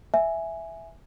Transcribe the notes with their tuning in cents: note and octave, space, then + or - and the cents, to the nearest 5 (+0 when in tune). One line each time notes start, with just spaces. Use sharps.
E5 +0 G#5 +0